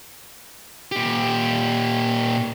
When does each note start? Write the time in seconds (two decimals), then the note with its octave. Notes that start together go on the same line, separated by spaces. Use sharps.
0.92 A#2 G4